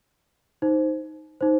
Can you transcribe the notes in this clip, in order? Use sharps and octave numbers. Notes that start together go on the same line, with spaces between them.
D#4 C5
D#4 C5